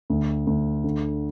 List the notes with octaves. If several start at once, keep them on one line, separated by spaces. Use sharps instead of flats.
D2
D2
D3